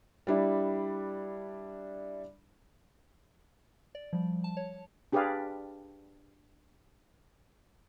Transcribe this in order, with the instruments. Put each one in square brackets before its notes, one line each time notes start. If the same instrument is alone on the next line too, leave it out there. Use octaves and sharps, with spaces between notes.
[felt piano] G3 D4 E4
[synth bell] D5
F3 G3
A5
C#5
[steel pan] D4 G4 G#4 B4 D5 F5